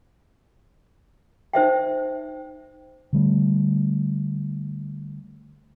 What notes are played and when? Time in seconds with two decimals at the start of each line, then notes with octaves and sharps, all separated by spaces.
1.53 D#4 C5 E5 G5
3.13 D3 G3 A3